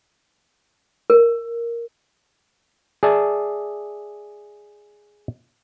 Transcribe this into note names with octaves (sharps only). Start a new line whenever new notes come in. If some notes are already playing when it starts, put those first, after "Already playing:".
A#4
G#4 D5 E5 A5